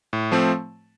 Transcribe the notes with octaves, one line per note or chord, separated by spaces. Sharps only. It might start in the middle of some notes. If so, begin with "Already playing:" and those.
A2
F3 A3 C4